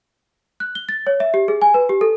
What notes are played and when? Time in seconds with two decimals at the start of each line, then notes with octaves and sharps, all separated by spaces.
0.60 F#6
0.75 G7
0.89 A6
1.07 C#5
1.20 E5
1.34 G4
1.48 G#4
1.62 G#5
1.74 B4
1.89 G4
2.01 A4